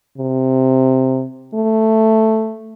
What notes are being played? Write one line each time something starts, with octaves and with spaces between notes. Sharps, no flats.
C3
A3